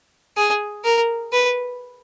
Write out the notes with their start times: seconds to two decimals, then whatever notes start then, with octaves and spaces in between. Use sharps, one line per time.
0.37 G#4
0.84 A#4
1.32 B4